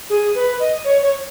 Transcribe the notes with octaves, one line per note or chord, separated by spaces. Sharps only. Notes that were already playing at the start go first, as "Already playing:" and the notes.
G#4
B4
D#5
C#5
C#5